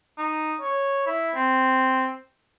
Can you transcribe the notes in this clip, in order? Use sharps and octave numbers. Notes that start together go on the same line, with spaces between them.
D#4
C#5
E4
C4